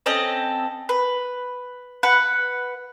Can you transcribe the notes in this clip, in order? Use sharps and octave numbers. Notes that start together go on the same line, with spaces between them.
C4 C#4 A4 D#5
B4
B4 F#5